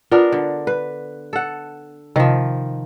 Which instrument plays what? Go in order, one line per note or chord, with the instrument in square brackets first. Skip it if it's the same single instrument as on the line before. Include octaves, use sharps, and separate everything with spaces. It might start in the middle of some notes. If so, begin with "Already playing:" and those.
[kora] B3 D4 A#4 [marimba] F4
[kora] D3
B4
A4 F#5
[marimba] C3 [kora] D#3 F3